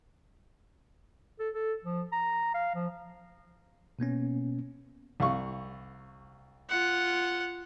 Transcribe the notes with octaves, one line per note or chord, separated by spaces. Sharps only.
A4
A4
F3
A#5
F5
F3
B2 A#3 B3 C#4
C2 F5 C#6
F4 F#5